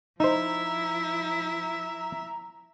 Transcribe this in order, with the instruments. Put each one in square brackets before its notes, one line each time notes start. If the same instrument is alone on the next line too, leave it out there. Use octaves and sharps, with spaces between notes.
[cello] F3 E4 [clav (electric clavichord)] D#4 C5 [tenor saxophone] E5 [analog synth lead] A#5